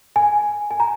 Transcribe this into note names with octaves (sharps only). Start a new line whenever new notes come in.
G#5
G#5
A#5